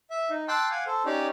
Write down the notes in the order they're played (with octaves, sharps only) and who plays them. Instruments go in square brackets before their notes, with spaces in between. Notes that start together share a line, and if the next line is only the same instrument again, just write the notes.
[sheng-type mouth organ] E5
D#4
G5 A5 C6 D6 E6 F#6
F5 F#5 G#5 D6
A4 C5
C#4 D#4 G4 C#5 D5